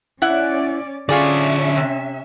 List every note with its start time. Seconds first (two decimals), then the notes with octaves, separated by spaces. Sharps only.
0.22 C#4 E4 D5 F#5
1.09 D3 C#4 F4 G#4 C#5 D5 E5
1.77 C3